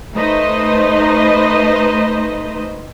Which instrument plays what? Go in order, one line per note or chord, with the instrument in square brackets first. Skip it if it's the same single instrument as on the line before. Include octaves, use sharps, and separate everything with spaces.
[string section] A3 D#4 B4 C5 D#5